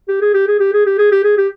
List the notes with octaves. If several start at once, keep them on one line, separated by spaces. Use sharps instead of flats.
G4
G#4
G4
G#4
G4
G#4
G4
G#4
G4
G#4
G4